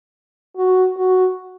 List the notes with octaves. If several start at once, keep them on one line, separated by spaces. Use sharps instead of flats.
F#4
F#4